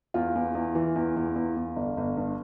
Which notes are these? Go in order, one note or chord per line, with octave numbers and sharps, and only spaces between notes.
E2 F4
E2
E2
E3
E2
E2
E2
E2
G1
G1
G2